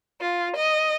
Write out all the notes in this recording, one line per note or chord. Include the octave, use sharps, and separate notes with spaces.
F4
D#5